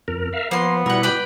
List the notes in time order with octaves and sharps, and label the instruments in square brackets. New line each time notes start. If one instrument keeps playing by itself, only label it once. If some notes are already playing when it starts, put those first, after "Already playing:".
[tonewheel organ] F2 A#4
A#4 E5 F5
[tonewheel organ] F3 [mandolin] A#3 C6 [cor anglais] B3
[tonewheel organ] B2 G3 E4 [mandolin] A#4 F#5
[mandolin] B4 D5 G5